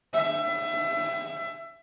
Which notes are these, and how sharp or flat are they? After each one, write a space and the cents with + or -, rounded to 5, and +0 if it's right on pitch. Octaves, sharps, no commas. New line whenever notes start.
E5 +30